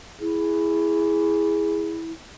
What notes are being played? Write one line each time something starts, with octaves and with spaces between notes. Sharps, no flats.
E4 G#4